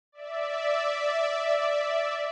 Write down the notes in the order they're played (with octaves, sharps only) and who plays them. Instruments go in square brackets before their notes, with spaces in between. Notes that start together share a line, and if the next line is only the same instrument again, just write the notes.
[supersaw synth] D5 E5